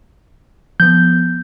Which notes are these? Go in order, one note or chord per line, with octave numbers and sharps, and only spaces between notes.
F3 B3 G6